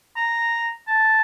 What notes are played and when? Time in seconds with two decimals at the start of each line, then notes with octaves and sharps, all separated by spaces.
0.16 A#5
0.87 A5